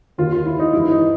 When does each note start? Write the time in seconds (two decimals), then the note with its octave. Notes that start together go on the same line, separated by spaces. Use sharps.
0.18 D#2 D#3 F4
0.32 F4
0.46 E4
0.59 D#4
0.73 G2 E3 E4
0.92 D#4